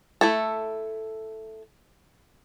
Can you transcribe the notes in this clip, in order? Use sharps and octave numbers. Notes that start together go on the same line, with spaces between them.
A3 E4 A4